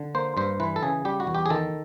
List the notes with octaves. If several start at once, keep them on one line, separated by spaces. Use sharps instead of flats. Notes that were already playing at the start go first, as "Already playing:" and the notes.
Already playing: D3
A#3 C5
G2 C5
E3 B4
A4
C#3 G#4
G3 G4
F#4
E2
G4
G#4
D#3 A4